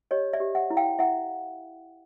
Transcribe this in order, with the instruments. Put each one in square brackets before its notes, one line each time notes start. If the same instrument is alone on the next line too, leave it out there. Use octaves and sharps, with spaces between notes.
[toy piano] G4 C#5 D#5
D5 E5
G4
E5 F#5
E4
F5 G5
E4 E5 F#5